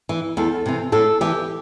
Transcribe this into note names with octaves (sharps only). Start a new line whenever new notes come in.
E3
E2 A4
C3 E3
A2 A4
E3 G4